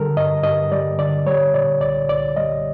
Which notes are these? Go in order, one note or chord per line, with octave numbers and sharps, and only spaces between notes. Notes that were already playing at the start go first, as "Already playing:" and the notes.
Already playing: D3 G3 A4 A#4
G2 D#5
G2 D#5
G3 D5
D3 D5
G3 C#5
A#2 D5
C2 D5
C2 D5
G3 D#5